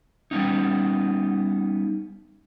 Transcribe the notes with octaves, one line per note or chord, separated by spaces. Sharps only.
G3 B3 C#4 D#4